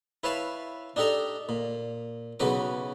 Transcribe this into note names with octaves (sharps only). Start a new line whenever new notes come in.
E4 B4 C#5 F5 A5 B5
D4 D#4 G4 A4 D5 A#5
A#2
B1 C#3 F#3 F#4 B4 D6